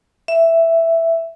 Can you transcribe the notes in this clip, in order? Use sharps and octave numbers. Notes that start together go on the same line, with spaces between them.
E5